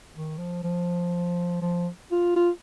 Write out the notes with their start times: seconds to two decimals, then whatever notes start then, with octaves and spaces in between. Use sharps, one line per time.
0.14 D#3
0.38 F3
0.64 F3
1.62 F3
2.11 F4
2.36 F4